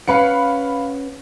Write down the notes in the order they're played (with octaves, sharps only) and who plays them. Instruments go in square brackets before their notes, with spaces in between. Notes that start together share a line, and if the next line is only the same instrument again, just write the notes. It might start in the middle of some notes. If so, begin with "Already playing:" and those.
[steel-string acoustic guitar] C#4 B4 F#5 [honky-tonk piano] F5 B5 C#7